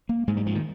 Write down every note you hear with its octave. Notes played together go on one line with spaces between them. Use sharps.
A#3
G#2 G#3
G3
F3
D#3